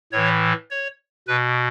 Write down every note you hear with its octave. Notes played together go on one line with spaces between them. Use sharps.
A2 E3 C#5
C#5
B2 B4